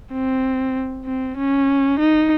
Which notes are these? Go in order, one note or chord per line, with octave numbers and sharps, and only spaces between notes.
C4
C4
C#4
D#4